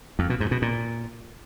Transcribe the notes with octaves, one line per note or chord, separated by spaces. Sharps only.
F2
B2
G#2
B2
A#2